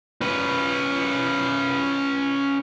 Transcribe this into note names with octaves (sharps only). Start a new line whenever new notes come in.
C#4 B4